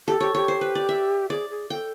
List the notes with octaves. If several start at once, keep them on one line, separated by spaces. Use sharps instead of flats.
G4 A4
G4 C#5
G4 C#5
C5
B4
D5
E5
G#4 D5
G#4
A4 G5